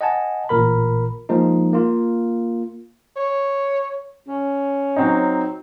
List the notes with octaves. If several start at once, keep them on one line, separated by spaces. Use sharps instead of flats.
D#5 F#5 G#5 A5
A1 A#2 A#4 B5
F3 G#3 A#3 D#4
A#3 F4
C#5
C#4
F#3 C4 D#4